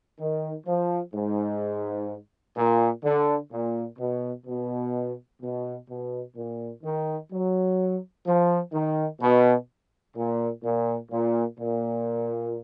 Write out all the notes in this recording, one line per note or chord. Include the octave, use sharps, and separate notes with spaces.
D#3
F3
G#2
A#2
D3
A#2
B2
B2
B2
B2
A#2
D#3
F#3
F3
D#3
B2
A#2
A#2
A#2
A#2